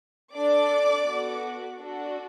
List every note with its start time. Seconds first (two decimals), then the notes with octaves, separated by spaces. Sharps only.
0.34 D4 A4 D5 D6
1.06 B3 F#4 A4
1.78 D4 F#4 A4